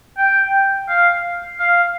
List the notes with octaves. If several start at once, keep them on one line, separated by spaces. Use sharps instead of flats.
G5
F5
F5